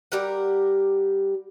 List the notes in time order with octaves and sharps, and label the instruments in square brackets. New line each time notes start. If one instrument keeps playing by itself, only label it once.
[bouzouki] G3 G4 A#4 F#5